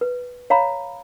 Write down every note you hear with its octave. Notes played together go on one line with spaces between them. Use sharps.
B4
C#5 F5 A#5 B5